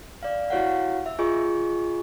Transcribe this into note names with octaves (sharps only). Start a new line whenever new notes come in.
D5 F5
E4 F#4 G4 C#5 F5 F#5
E5
F4 G#4 D#5 G#5 C#6